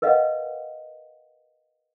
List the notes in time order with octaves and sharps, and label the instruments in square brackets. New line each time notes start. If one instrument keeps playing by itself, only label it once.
[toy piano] A#4 B4 D#5 F5 F#5